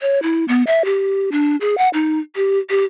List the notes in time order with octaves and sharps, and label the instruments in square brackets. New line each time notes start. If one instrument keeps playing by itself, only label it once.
[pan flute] C#5
E4
B3
E5
G4
D4
G#4
F#5
D#4
G4
G4